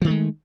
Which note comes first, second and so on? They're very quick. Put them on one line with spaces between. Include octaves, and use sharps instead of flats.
F3 D#3 A3 G#3